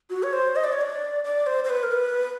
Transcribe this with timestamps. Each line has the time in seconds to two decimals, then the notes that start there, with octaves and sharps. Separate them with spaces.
0.10 F#4
0.23 C#5
0.33 C5
0.56 D#5
0.64 D5
0.73 C#5
0.81 D5
1.24 D5
1.47 C5
1.64 C5
1.70 B4
1.83 A#4
1.92 B4